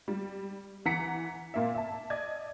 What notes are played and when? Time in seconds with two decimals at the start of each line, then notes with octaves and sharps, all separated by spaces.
0.08 G3
0.85 E3 F#5 A#5 B6 C#7
1.54 A#2 A#3 E5
1.74 E5 A5
2.10 D5 D#5 G#6